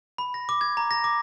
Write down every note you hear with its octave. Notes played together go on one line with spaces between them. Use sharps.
B5
A#6
D6
G#6
A#5
A#6
D6